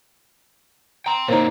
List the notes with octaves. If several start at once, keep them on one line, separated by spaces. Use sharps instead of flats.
G5 A#5 C6
A#2 A#3 C4 D#4 C5 C#5 A#5